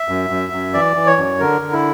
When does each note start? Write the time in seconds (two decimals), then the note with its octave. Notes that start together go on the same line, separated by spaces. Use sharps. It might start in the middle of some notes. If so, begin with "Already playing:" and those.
Already playing: E5
0.09 F#2
0.30 F#2
0.52 F#2
0.74 E3 D5
0.96 E3
1.07 C#5
1.18 F#2
1.40 D3 A#4
1.62 D3
1.73 E4